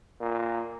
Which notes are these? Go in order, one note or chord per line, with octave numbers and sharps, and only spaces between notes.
A#2